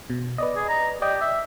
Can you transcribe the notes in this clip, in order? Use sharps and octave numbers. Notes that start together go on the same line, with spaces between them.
B2
B4 D5 D#5
G#4
A#5
G4 D5 D#5 G5
E5